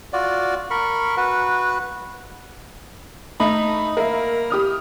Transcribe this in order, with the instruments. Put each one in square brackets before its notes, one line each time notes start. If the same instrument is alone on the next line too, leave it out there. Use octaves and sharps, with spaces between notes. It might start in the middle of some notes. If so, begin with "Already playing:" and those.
[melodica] F4 F#4 D5
A#4 B5 C#6
F#4 B4
[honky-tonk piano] A3 [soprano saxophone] D#4 [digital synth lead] B5
[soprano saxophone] A#3 [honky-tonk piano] A#4 E5
[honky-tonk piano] G4 D#6 F6